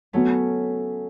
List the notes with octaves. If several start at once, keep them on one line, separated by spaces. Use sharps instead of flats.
F#3 A3 B3 C#4 F#4